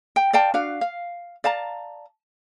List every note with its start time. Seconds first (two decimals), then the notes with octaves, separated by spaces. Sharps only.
0.16 G5
0.33 D5 F5 G5 A5
0.54 D4 F#4 F5
0.81 F5
1.44 D5 F5 A5 A#5